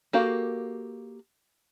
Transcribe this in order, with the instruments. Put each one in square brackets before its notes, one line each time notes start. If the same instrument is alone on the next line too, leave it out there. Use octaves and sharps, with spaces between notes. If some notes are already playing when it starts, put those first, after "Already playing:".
[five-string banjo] A#3 F#4 G4 A4 F5